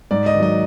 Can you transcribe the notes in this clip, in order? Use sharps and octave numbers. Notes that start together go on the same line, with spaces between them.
G#2 D5
D#5
D#3
F#3 D#5